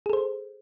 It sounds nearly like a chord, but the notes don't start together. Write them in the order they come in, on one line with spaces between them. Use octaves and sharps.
G#4 A4 C5